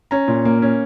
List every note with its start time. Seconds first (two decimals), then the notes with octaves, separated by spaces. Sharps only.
0.11 C#4 A#5
0.28 A#2
0.45 A#3
0.62 C#4